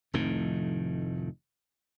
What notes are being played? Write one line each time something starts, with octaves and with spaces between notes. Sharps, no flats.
F1 F2 A2 D#3